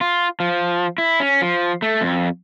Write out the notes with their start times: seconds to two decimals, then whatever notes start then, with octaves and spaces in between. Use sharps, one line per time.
0.01 F4
0.40 F3
0.98 E4
1.20 C#4
1.41 F3
1.82 A3
2.01 F2